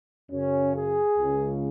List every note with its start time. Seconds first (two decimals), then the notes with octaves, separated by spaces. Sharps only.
0.31 F#2 C#3 C#4
0.75 G#4
1.19 C#2 C#3